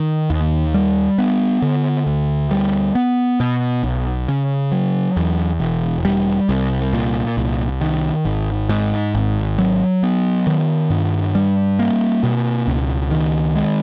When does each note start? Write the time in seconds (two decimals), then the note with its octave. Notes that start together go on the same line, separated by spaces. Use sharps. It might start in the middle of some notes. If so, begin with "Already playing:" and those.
Already playing: D#3
0.30 D#2
0.74 G3
1.18 B3
1.62 D3
2.07 D2
2.51 G3
2.95 B3
3.40 B2
3.83 B1
4.28 C#3
4.72 F#3
5.17 E2
5.60 E1
6.05 G3
6.49 C2
6.93 A#2
7.37 C2
7.81 D#3
8.25 G#1
8.69 G#2
9.15 G#1
9.58 F#3
10.03 B3
10.47 D#3
10.90 G2
11.35 G3
11.79 A#3
12.23 B2
12.67 C#2
13.11 D#3
13.56 G#3